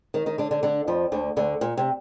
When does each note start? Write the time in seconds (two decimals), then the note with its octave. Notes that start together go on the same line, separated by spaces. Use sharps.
0.14 D#3 D#4
0.26 D#3 D#4
0.38 D3 D4
0.51 D3 D4
0.63 D3 D4
0.87 F2 F3
1.12 D2 D3
1.36 D2 D3
1.61 A#2
1.77 C3